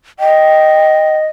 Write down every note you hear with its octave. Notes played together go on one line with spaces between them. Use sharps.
D#5 G5